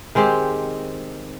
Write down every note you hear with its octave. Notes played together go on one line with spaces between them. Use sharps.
D#3 G#3 C4 G4